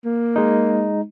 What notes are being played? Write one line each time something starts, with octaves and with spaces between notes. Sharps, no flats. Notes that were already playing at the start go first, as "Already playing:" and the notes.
A#3
G#3 D#4